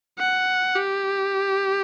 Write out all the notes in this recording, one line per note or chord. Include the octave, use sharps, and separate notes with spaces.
F#5
G4